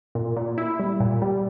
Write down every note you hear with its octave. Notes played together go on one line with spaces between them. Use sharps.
A#2
A#2
E4
G3
A#2
G3